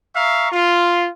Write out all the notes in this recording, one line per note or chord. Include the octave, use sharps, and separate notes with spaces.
E5 F5 A#5 C#6
F4